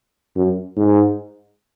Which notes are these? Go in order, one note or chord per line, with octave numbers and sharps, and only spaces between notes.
F#2
G#2